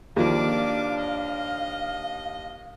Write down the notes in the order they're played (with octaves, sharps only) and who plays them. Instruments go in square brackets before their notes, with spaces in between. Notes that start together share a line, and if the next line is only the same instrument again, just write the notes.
[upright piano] D#2 F3 [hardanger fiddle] D4 D6 [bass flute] F5
[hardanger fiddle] D#5